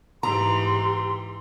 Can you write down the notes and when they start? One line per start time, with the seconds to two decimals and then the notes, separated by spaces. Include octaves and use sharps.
0.23 G#2 E3 G4 A#5 C6